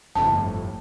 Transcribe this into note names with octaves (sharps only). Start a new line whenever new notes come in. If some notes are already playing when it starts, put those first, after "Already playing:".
G1 F2 A2 A5